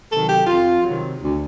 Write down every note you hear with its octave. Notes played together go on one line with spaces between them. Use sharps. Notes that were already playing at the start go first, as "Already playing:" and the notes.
C3 D#3 F#3 A4
G4
F2 F4
C3 D#3 F#3
D2